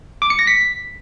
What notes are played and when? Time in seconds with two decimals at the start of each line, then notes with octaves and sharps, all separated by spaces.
0.22 D6
0.30 C#7
0.39 A#6
0.47 B6